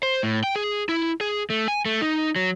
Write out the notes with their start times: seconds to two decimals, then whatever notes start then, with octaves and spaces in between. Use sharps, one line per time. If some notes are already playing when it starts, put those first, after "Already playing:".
0.03 C5
0.23 A2
0.43 G5
0.56 G#4
0.89 E4
1.21 G#4
1.50 A3
1.68 G#5
1.85 A3
2.02 D#4
2.36 F#3